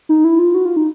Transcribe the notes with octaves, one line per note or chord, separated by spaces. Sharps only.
D#4
E4
F4
F#4
F4
D#4